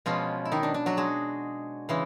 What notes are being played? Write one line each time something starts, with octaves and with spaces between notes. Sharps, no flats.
B2 F3 G#3 C#4 F4
E4
D#3 D#4
D4
D4
F#3 F#4
G#3 G#4
C#3 E3 G#3